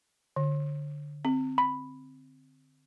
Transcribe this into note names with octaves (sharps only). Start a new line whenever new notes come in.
D3
C4
B5